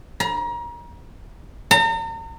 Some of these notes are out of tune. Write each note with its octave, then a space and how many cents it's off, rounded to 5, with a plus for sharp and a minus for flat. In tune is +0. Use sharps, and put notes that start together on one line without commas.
A#5 +30
A#5 -40